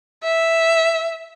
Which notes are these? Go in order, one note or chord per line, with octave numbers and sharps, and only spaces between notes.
E5